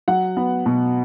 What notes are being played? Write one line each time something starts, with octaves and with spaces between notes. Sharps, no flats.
F#3 F#5
B3
B2